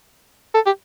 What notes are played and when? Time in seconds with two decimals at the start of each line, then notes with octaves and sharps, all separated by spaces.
0.55 A4
0.66 G4